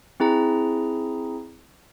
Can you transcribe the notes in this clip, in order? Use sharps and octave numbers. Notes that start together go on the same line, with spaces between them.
C4 E4 G#4 A#5